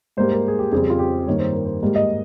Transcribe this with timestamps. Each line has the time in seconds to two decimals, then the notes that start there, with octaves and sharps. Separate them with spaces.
0.17 G#2 G3 A#3 C5
0.32 A#4
0.48 G#4
0.59 G4
0.72 F2 C#3 G3 C4 G#4
0.90 F4
0.99 G4
1.26 G2 D#3 A#3 C#5
1.39 C5
1.53 A#4
1.65 C5
1.82 G#2 G3 A#3
1.96 D#5